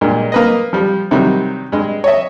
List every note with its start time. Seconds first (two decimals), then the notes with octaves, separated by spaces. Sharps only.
0.01 G2 A#2 G#3
0.32 A#3 B4 D#5
0.73 F3 G3
1.11 C3 D#3 F#3 G3
1.72 G2 G#3
2.04 C#5 D#5 E5